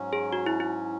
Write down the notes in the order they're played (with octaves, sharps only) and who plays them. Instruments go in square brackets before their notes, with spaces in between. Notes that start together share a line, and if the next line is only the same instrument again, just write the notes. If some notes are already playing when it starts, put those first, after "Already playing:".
Already playing: [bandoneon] G#2 F#3 C#4
[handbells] G#4
F#4
E4
E4